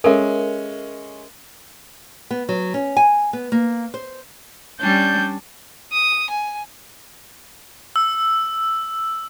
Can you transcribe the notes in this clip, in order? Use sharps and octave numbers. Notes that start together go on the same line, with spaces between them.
G#3 C#4 A4 A#4 E5
B3
F#3
C#4
G#5
B3
A#3
C5
G3 C#4 D4 G6
D#6
G#5
E6